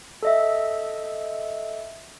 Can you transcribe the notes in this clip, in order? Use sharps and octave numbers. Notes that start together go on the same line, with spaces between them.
A4 D#5 E5